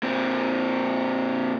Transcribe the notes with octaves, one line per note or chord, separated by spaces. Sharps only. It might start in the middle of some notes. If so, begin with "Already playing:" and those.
A#2 C4